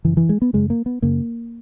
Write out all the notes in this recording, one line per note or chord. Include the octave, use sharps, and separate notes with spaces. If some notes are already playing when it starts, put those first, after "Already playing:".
F#2 C#3 E3
E3
G#3
B3
F#2 C#3 G#3
A#3
B3
F#2 C#3 A#3